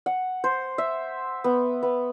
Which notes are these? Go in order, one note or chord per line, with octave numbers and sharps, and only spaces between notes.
F#5
C5
E5
B3
B3